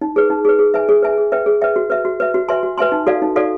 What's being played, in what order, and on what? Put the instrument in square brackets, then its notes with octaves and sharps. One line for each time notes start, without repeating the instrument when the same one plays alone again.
[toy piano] D#4
G#4 B4
D#4
G#4 B4
G#4
B4 E5 G#5
G#4
B4 E5 G#5
G#4
B4 E5 G5
G#4
B4 E5 G5
F#4
B4 E5
F#4
B4 E5
F#4
B4 E5 G#5 C6
F#4
B4 E5 G#5 C6
D#4
F#4 A4 D5 F5
D#4
F#4 A4 D5 F5